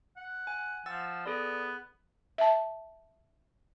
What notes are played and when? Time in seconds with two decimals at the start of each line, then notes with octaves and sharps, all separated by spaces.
0.17 F#5
0.47 G#5
0.86 F3 F#5 E6 A6
1.26 B3 G#4 A4 D5
1.62 F#6
2.38 E5 A5